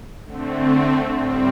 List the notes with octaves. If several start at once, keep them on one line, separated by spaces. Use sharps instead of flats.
D3 A3 C4
A2 G3 C4